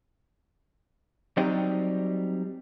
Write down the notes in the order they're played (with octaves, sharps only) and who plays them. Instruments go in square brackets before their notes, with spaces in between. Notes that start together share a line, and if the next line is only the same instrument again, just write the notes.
[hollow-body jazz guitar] F#3 G3 C4 D#4 G4